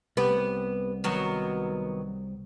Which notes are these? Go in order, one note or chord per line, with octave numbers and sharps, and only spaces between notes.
C2 B3 G4 B4
D#3 F#3 B3